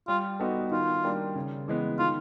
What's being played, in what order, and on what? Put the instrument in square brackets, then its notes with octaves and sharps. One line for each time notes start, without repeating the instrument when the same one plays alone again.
[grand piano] G3 [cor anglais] F4
[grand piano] B3 D#4 F#4 A4
[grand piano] D#3 [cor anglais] F4
[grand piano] G3 A#3 D4
C#3
E3 G#3 B3
[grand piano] D#3 [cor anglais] F4